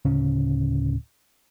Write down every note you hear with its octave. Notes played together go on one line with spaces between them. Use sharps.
D1 C#3 C#4